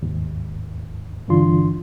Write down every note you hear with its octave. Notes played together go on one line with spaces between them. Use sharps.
D#2 G#2
G2 D3 E3 D4 F4 C6